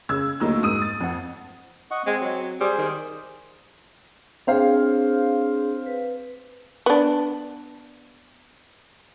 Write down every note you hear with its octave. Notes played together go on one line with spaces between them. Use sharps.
C#3 E6 G#6
D2 F#3 A3 A#3 D#4 E6
G#2 D#6 E6 D#7
A6
F2 F#5
D#5 F#5 C#6
G#3 C4
F#3
G3 G#4 C5
D#3
C4 D4 G#4 C5 C#5 F5
B4
B3 D4